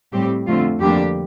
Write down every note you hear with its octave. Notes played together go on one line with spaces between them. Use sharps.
A2 G3 C4 G4
F2 D3 A3 C4 F4
F2 D3 G3 A#3 D4 G4